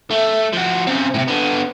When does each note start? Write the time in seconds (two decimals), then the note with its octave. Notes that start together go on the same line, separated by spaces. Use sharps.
0.11 A3
0.53 F3 F#4
0.87 C#3 C4
1.14 A2 C3
1.28 D3 B3